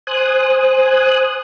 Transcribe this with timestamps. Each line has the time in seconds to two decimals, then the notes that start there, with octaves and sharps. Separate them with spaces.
0.07 C5 G#5 D#6 F#6